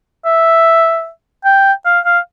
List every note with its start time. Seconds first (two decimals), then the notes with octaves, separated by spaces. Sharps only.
0.25 E5
1.45 G5
1.86 F5
2.05 F5